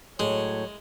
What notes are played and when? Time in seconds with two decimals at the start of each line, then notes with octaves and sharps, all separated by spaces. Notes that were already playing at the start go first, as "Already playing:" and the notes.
0.19 A2 F#3 G#3 C#5